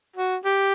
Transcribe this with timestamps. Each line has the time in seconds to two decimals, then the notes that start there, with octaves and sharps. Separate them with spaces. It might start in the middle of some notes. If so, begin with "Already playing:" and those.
0.16 F#4
0.44 G4